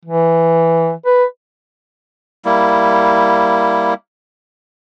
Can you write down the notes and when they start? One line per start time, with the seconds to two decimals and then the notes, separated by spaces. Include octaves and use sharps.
0.05 E3
1.06 B4
2.45 G3 A#3 E4